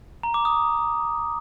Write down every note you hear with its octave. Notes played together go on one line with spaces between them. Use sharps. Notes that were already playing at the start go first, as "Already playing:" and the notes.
A#5
D6
D#6